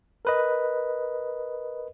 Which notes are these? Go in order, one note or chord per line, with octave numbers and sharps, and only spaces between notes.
A#4 B4 D#5